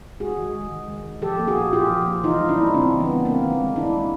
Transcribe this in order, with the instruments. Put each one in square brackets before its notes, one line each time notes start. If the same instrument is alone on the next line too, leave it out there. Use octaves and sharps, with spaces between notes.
[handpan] G#3 F#4 G#4
D#3
G#3
D#3
G#3
D#3
F3 G4 A4
A#3
F#4 G#4
A#2
A#2 F4 G4
F3
A#3
E3 D#4 F4
G3
D4 E4
A#3
C#3 C4 D4
E3
B3
G3
G#3 A#3 C4
D#3
G#3
D#3 D4 E4
G#3